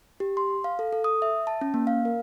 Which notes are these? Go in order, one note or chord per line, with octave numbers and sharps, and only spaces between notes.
G4
C6
F5
A4
A4
D#6
E5
A5
C#4
A#3
F5
A#4